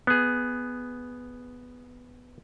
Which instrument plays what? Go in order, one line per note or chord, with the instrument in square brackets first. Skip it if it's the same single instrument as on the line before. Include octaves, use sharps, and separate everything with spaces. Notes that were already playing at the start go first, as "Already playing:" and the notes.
[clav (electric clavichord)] B3 G#4